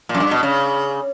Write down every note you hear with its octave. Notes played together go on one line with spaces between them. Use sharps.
A#2
F#2
G2
B2
C#3